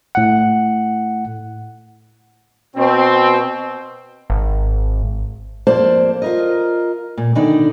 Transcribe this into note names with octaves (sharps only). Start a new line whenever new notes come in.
A2 F#5
B2 C4
G#1
F2 A#3 C5 D5 F5 A5
F4 A#4 D#5
A#2
B2 D3 D#3 D4 D#4 D5